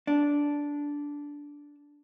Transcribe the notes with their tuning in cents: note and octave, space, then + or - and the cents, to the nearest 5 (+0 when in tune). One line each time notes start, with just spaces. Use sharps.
D4 -10